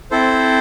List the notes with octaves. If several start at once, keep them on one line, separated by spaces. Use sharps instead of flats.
C4 E4 A4 C5